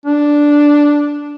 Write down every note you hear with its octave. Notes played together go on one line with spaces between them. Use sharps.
D4